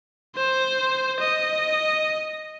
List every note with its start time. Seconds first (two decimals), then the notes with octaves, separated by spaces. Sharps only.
0.36 C5
1.20 D#5